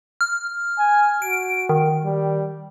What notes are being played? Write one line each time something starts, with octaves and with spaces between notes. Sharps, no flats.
F6
G#5
F#4 D7
D#3
G3